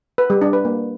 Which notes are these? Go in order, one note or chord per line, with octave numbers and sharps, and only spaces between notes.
B4
G3
D4
B4
A#3